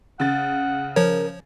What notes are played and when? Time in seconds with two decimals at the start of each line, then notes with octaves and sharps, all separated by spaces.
0.20 C#3 F#5 A6
0.96 F3 A#4 C#5